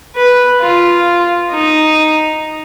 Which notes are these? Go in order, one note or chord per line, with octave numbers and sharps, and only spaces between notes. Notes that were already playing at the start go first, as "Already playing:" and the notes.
B4
F4
D#4